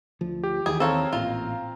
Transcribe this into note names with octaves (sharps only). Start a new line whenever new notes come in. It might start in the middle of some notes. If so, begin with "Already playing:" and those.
D2 F3
G4
D#2 D#3 E3 G#4
C4 A4 C#5 F5 A#5
A1 A#2 F4